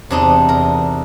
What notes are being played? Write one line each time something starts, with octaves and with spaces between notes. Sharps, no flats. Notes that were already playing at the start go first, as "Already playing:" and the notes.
E2 C3 D4 D#4
A#4